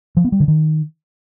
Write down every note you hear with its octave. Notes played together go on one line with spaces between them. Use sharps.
F3
B3
G3
D3
D#3